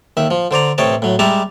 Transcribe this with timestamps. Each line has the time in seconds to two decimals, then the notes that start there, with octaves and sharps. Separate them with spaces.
0.17 D#2 D#3 E5
0.31 F3
0.51 D3 C5 D5 A#5
0.78 A1 C3 C#5 D#5 G5 A5
1.02 A2 F#3
1.19 G3 G#3 G4 E5 A5 A#5